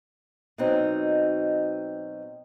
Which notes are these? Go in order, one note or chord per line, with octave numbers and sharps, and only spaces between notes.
B2 F#3 C4 D#4